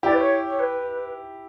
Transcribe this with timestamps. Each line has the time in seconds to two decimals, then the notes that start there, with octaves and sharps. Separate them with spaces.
0.03 E4 G4 D5
0.11 B4
0.17 C#5
0.45 C#5
0.59 B4